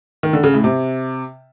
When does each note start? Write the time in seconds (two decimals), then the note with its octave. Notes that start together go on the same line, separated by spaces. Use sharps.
0.23 D#3
0.33 D3
0.44 C#3
0.54 A2
0.64 C3